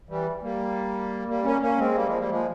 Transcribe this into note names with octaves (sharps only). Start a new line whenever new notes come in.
E3 G3
G3 A#3
G3 A#3
A#3 C#4
A#3 C#4
G#3 C4
G3 A#3
F3 G#3
G3 A#3
F3 G#3